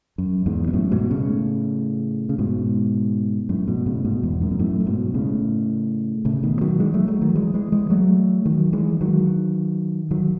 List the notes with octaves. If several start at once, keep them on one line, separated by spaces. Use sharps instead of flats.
F#2
E2 G#2
B2
F#2 A2
G#2 B2
A2 C#3
C#3
G#2 B2
F#2 A2
G#2 B2
A2 C#3
G#2 B2
E2 G#2
F#2 A2
B2
F#2 A2
A2
G#2 B2
A2 C#3
A2 C#3
B2 D#3
D#3 F#3
E3 G#3
F#3 A3
F#3 A3
D#3 F#3
E3 G#3
E3 G#3
E3 G#3
F#3 A3
D#3 F#3
E3 G#3
D#3 F#3
D#3 F#3